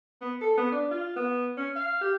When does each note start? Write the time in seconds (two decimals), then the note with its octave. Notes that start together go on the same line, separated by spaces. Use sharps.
0.21 B3
0.41 A4
0.58 B3
0.72 D4
0.91 F4
1.16 B3
1.57 C#4
1.76 F5
2.01 G4